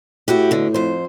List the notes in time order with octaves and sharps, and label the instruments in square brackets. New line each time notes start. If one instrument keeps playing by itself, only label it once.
[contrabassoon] A2 [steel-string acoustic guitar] E4 F#4 G4
[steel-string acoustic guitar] B2 D3
F2 C5